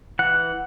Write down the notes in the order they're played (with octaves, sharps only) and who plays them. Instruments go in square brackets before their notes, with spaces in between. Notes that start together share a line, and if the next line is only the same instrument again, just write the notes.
[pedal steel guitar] E3 F#5